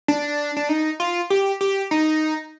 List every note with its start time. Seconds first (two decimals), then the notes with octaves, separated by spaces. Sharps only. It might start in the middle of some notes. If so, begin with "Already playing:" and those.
0.08 D4
0.57 D4
0.69 D#4
1.00 F4
1.30 G4
1.61 G4
1.91 D#4